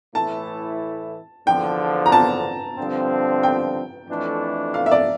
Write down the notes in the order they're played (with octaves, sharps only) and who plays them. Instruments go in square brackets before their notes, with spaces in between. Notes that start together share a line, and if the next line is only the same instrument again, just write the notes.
[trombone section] A2 E3 A3 E4 [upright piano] A5
[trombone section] E2 D3 F3 [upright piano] G5
[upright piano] A#5
A5
[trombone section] G2 D3 F3 C4
[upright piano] G5
[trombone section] F2 E3 A3 D4
[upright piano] F5
E5
D5